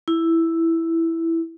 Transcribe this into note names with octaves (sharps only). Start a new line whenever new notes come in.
E4